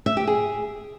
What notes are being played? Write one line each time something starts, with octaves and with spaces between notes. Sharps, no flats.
E5
G4
G#4